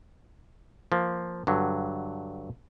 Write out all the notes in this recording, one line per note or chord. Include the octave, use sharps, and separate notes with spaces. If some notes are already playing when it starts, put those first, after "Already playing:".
F3 A#3
G2 D3 F#3